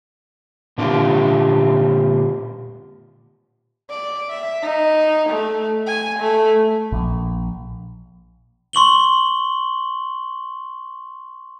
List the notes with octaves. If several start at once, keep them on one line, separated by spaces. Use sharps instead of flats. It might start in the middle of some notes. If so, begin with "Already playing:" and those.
A#2 D3 A#3 F4 G4
D5
E5
D#4
A3
G#5
A3
A#1
C6 C#6 F#7 G7